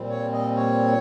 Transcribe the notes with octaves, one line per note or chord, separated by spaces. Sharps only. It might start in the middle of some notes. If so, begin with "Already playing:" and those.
Already playing: A#2 G3 C4
C#5
D#5
C#5